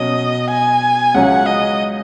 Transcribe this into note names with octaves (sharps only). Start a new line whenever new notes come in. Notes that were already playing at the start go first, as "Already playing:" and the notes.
Already playing: B2 F#3 C#4 D#5
G#5
C#2 C#3 F#3 C#4 F#5
D#5